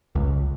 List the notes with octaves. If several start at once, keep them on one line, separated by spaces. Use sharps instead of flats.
C#2